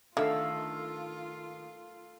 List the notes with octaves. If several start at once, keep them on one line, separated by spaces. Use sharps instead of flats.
D3 D#3 F4 A4 E5 F5